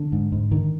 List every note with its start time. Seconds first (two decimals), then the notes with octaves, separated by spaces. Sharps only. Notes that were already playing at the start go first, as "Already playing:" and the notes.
Already playing: D3
0.12 G#2
0.32 G#2
0.51 D3 D#3